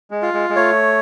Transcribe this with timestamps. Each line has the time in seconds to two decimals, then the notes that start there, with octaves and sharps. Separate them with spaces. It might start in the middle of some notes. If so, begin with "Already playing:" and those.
0.11 G#3
0.22 F4
0.34 G#3
0.49 G#3
0.56 A3 C#5